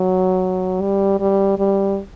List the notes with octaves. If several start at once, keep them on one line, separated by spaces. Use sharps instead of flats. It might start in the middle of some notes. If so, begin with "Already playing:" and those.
Already playing: F#3
G3
G3
G3